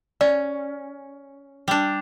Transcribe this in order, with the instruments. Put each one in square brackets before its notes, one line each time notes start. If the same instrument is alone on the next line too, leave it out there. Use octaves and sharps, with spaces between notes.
[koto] C#4 [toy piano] D5
[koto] G3 D4